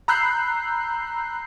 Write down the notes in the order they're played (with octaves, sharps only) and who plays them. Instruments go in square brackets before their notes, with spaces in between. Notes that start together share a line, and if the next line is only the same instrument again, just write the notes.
[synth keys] A#5 B5 E6 F#6 G6 C7